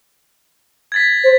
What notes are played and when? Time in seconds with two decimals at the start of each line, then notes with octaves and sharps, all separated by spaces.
0.92 G#6 A6 B6
1.24 C5